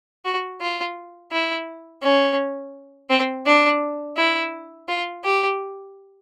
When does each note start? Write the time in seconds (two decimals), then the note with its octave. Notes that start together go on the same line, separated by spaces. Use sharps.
0.25 F#4
0.61 F4
1.32 E4
2.02 C#4
3.10 C4
3.46 D4
4.17 E4
4.88 F4
5.23 G4